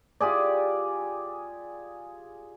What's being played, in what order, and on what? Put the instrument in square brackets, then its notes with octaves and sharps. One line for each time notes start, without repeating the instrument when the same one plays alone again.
[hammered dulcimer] F4 G4 G#4 D5